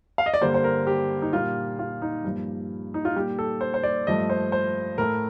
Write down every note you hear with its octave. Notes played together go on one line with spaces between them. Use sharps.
F5
D#5
D5
G2 D3 G3 A#3 C5
C5
A#4
G4
D#4
A#2 G3 A#3 F4
F4
D#4
G2 F3 A#3
D#4
F4
A#2 G3 A#3 G4
A4
C5
C5
D5
G2 F3 A3 D#5
C5
C5
A2 A3 A#4